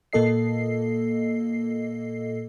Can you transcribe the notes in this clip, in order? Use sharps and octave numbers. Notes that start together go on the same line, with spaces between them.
A#2 A#3 A4 D#5 C7